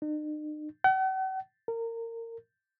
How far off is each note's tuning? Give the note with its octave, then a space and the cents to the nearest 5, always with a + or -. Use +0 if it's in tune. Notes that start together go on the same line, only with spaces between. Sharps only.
D#4 -45
F#5 +45
A#4 -25